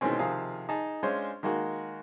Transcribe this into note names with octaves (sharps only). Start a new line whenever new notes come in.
B2 D#3 E3 G#3 C4 C#4
C3 D#3 F3 G#4 F5 D#6
D#4 G#4 A5
G#3 C#4 D4 F4 C5 C#5
D#3 G#3 A#3 F#4